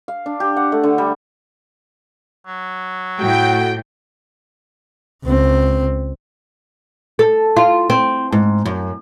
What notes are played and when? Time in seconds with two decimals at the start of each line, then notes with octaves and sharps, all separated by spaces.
0.08 F5
0.26 D4
0.40 G4
0.57 F#5
0.72 A3
0.84 D3
0.98 G3
2.46 F#3
3.20 A2 F#4 G5
5.24 C#2 C4
7.19 A4
7.57 F4
7.90 C4
8.32 G#2
8.65 F#2